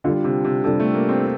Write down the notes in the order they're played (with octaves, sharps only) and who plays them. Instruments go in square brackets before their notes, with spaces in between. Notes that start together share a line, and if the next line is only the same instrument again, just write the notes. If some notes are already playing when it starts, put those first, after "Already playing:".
[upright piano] D3 [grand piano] G3 D4 F4
[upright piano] C3
C3
[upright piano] C3 [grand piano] G3 D4 F4 A4
[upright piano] A3
A#3
C4